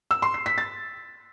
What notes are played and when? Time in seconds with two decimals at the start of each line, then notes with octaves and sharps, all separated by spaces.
0.11 E6
0.22 C6
0.34 C7
0.46 B6
0.58 A6